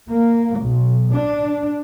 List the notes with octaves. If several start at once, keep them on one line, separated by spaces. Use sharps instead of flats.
A#3
B1
D4